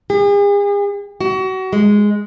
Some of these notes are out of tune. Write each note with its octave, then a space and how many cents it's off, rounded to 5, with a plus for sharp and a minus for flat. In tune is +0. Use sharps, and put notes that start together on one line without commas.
G#4 -45
F#4 +30
G#3 -5